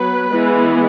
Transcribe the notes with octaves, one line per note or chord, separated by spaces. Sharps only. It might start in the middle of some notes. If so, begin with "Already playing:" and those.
Already playing: F#3 B3 B4
E3 G#3 B3